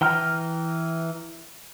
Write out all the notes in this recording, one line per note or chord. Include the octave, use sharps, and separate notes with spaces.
E3 G5 A#5 F6